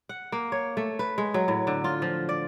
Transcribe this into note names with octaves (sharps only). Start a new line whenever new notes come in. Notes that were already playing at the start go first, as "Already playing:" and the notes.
F#5
A#3
C#5
A3
B4
G#3
F#3
A2
D3
F4
F3
D5